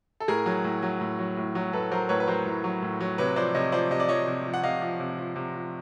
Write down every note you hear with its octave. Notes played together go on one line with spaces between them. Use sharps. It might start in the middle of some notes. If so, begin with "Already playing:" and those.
A4
A2 G#4 A#4
F#3
A2
F#3
A2
F#3
A2
F#3
A2 A4 B4
F#3 A#4 C5
A2 B4 C#5
B4
F#3 A#4 C5
A2
F#3
A2
F#3
C3 B4 C#5
F3 C5 D5
C3 C#5 D#5
F3 C5 D5
C3 D#5
D5
F3 C#5 D#5
C3
F3
F#5
C3 D#5 F5
F3
C3
F3
C3
F3